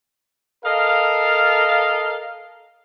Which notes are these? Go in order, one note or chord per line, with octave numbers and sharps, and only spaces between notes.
A4 A#4 D#5 F5